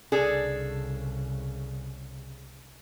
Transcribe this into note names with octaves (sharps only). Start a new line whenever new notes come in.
C2 C#3 D4 G#4 A4